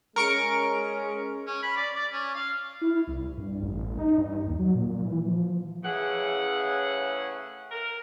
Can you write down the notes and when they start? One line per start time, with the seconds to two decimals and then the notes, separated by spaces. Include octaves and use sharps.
0.16 G#3 C#4 A#4 C#6 D7
1.47 C#4
1.63 B5
1.76 D5
1.96 D5
2.12 C#4
2.35 F5
2.81 E4
3.07 C2
3.37 G2
3.62 A1
3.99 D#4
4.18 G2
4.48 D#2
4.59 F#3
4.75 A#2
5.05 E3
5.27 F3
5.84 A2 C#3 E3 C#4 G#4 F#5
7.71 A#4